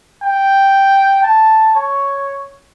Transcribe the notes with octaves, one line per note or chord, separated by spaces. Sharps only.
G5
A5
C#5